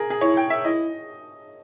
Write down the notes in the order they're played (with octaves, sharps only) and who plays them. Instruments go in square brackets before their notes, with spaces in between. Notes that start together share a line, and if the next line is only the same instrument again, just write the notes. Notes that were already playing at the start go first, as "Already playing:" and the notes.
Already playing: [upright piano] G#4 A#4
G#4
[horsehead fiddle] E4 [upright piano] C#5
[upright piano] G5
E5
[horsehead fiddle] E4 [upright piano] D#5